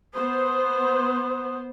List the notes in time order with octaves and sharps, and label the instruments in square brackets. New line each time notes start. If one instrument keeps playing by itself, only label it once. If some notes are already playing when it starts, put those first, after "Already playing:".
[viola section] B3 C5 [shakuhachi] D#6